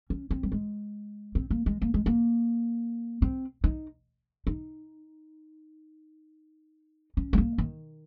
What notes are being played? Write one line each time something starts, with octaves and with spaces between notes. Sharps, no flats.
C#4
C4
G3
G#3
C4
A#3
G#3
A#3
G#3
A#3
C4
D#4
D#4
C#4
G#3
A#3
D#3